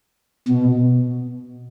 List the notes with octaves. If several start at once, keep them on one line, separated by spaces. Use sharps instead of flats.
B2